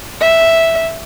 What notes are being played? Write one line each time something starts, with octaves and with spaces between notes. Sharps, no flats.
E5